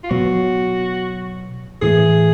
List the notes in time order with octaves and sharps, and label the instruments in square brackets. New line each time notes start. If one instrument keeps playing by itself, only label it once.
[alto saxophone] F4
[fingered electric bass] B2 F#3 B3 [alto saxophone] F#4
[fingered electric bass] A2 E3 A3 [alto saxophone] G#4